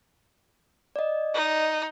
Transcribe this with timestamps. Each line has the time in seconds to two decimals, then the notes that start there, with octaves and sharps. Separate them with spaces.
0.96 D5 D#5
1.34 D#4